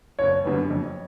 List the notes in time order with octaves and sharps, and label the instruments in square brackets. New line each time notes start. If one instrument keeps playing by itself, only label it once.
[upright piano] F#1 [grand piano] C#5
[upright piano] F#2 D3 G3 B3
F2